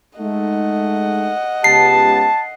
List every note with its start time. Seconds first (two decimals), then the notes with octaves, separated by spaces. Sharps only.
0.19 G#3 A3 D#4 D#5 F#5
1.64 C#2 B3 G4 A5 C7